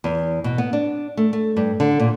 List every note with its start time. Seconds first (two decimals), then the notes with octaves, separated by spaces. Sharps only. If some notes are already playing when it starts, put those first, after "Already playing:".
0.04 E2
0.44 B2
0.58 B3
0.73 D4
1.17 A3
1.33 A3
1.57 G2
1.80 D3
2.00 A#2